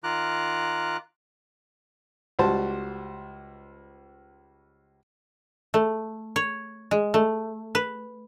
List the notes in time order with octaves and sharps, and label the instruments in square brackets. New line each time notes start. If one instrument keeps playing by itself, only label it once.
[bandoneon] D#3 F4 A#5 D6 F#6
[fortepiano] C#2 G3 F#4 C5 A5
[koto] A3
C#5
G#3
A3
B4